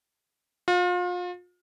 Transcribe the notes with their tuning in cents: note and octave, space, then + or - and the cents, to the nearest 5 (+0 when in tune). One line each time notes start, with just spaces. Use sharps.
F4 +35